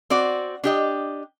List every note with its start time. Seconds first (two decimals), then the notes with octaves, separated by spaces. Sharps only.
0.10 C4 F#4 D5
0.64 D4 G4 D#5